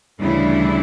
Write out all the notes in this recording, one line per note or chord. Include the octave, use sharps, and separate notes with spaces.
D2 C#3 E3 G3 D4 E4